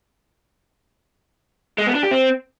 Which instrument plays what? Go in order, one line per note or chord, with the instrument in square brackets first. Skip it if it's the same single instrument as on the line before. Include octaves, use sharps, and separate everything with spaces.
[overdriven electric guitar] G#3
B3
D4
G4
C4